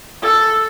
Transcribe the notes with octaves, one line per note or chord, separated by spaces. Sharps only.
A4